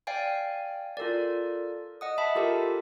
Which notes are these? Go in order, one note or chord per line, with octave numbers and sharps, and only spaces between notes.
D5 F5 G5 G#5
F4 A4 A#4 D5
D#5 F#5 D#6
E5 A5 B5
F4 G4 A4 A#4